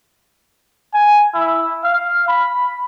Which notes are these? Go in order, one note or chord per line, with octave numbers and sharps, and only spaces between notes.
G#5
E4
F5
B5